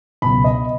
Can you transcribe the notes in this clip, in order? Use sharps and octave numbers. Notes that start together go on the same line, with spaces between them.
C#2 B2 F#3 B5
D#5